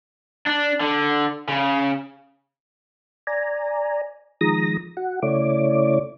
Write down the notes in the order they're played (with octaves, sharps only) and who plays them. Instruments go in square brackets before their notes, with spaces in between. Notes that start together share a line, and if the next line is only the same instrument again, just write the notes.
[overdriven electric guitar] D4
D3
C#3
[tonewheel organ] D5 G#5 A#5
D#3 F3 G#3 A#5 D#6 A#6
F#4 F#5
C#3 A3 E4 C#5 D5 D6